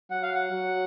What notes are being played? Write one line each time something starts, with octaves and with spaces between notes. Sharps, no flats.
F#3 F#5
F5
F#5
F#3